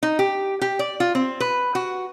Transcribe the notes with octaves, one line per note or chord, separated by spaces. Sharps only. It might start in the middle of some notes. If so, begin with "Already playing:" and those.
D#4
G4
G4
D5
F4
C4
B4
F#4